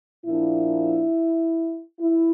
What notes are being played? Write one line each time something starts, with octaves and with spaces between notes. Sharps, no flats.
A#2 F3 A#3 D4 E4
E4